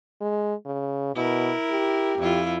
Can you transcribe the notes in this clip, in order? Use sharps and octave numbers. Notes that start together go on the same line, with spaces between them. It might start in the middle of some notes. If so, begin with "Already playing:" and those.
G#3
C#3
B2 E4 A#4
G4
F2 E4 F4